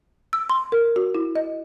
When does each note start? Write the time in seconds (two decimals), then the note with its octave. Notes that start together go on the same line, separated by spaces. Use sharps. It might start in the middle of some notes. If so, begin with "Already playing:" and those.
0.33 E6
0.50 C6
0.72 A#4
0.96 F#4
1.15 E4
1.35 D#5